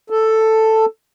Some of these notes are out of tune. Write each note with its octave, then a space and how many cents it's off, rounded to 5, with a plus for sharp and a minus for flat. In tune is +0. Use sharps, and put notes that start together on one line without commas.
A4 +5